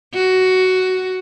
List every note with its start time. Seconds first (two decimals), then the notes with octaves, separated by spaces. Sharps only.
0.14 F#4